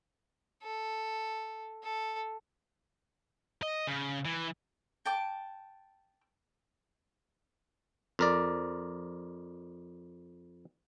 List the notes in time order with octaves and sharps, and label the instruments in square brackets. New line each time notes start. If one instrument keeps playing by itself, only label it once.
[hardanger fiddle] A4
A4
[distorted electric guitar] D#5
C#3
E3
[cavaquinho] G5 A5 D6
[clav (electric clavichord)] F2 A#4 D5